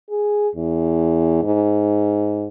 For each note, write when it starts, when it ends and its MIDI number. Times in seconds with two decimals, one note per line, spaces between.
0.10 0.48 68
0.56 1.42 40
1.43 2.48 44